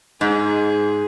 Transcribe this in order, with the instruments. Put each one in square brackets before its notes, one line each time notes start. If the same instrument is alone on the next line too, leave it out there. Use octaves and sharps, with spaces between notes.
[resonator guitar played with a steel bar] G#2 [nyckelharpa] G#4